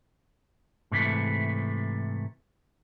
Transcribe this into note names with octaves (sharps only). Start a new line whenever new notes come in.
G#2 C3 D#3 E3 A3